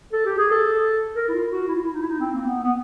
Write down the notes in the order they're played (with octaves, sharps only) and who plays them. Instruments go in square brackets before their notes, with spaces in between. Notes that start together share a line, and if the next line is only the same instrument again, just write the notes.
[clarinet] A4
G4
G#4
A4
A#4
E4
F4
F#4
E4
F4
E4
D#4
E4
D#4
C4
A#3
B3
B3